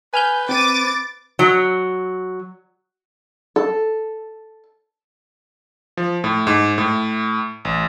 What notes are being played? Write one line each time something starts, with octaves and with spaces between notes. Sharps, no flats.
B4 G#5 F6 G6
C4 D6 A6 D#7
F#3
A4
F3
A2
G#2
A2
A1